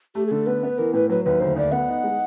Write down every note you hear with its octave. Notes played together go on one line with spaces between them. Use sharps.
A3 G4
G#4
D3 A4
B3 B4
B3
E3 A#4
A2 B4
F#3 B4
D#2 B4
D2 C5
D2 D5
B3 F#5
D#4
G#3